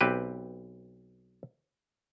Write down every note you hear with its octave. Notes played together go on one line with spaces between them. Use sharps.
B1 C4 G4 B4